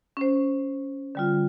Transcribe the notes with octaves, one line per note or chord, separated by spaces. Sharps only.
C#4 C5
D3 G3 F4